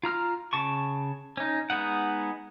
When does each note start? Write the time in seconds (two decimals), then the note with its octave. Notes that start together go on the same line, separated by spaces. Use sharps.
0.03 F4 A#5 F6
0.53 C#3 A5 C#6
1.37 C#4 D#4
1.70 G#3 B3 D#4 F#5